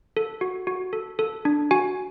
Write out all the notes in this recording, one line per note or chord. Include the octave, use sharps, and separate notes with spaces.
A4
F#4
F#4
A4
A4
D4
F#4 G#5